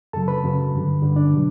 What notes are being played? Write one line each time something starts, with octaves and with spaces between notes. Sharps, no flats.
F#2 C#3 F#3 A4 A5
B4 B5
F#2 C#3 F#3
G2 D3 G3
G2 D3 G3
D4 D5
B2 F#3